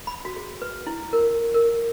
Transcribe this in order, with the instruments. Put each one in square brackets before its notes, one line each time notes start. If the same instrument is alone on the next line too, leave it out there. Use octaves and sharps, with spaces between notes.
[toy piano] B5
F#4
G#4
B4
E4
A#4
A#4